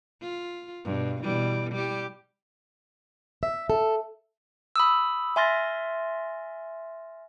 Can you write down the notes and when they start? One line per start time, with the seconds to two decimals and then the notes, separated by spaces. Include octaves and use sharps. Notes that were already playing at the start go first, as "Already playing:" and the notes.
0.22 F4
0.85 G2 B2
1.23 B2 E3 G3
1.72 G3 G4
3.43 E5
3.70 A4
4.76 B5 D#6 E6
5.36 E5 G#5 C6 F6 A6 A#6